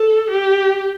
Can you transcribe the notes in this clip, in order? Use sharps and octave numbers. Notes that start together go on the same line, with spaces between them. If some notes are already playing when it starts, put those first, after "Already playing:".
Already playing: A4
G4